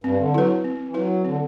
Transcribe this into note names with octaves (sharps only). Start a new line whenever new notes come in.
G2 C4
D3
F#3 E4 B4
C4
E3
F#3 E4 B4
D3 C4